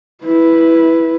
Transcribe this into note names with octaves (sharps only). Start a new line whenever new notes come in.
E4 B4